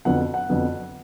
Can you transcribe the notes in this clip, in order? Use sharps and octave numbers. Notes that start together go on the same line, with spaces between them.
F2 D3 F#3 B3 F#5
F#5
F2 D3 F#3 B3